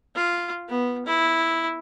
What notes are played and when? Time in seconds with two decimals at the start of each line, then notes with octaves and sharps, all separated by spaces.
0.15 F4
0.68 B3
1.06 E4